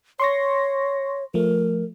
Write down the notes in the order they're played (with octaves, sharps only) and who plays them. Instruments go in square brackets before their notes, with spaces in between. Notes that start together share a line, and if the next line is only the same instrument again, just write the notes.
[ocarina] C#5 [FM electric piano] C6 C#6 A#6
[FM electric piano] F3 A3 [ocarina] A#4